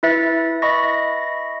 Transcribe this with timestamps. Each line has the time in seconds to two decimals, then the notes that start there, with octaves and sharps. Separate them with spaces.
0.03 E4 B4 E5 A6 C#7
0.62 D#5 E5 B5 C#6 A#6